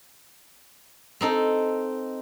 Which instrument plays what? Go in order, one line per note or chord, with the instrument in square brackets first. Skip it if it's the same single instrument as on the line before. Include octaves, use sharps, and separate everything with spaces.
[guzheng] C4 D#4 A4